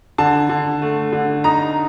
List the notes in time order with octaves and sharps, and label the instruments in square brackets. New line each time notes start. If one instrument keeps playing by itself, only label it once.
[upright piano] D3 A5
D3
A3
D3
D#4 A#5